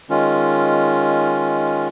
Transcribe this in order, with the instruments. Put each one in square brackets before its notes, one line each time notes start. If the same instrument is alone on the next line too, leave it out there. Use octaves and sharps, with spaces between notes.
[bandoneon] D#3 G#3 C#4 F4